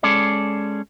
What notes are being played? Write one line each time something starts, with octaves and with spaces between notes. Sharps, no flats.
G#3 C#4 G#4 A4 D5